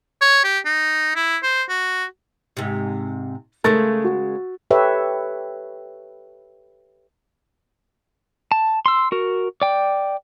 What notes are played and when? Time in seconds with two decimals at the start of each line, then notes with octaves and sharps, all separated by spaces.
0.21 C#5
0.44 G4
0.66 D#4
1.16 E4
1.43 C5
1.69 F#4
2.57 G#2 C3
3.64 C#3 G#3 A3 A#4 A6
4.04 F#4
4.70 G4 A4 B4 C#5 E5
8.52 A5
8.86 C6 E6
9.12 F#4 A#4
9.62 D5 G5